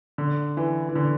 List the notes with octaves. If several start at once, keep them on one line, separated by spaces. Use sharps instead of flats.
D3
E3
E3
D3